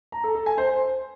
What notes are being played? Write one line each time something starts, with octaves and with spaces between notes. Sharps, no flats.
A#5
A4
A4
G#5
C5